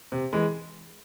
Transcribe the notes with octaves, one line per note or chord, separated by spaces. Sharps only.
C3
E3 G#3